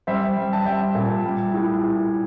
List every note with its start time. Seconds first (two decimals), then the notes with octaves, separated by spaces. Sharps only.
0.07 G3 C5 E5
0.37 G3
0.53 A5
0.66 G3 E5 G5
0.95 A#2
1.24 G3
1.54 A2
1.83 A2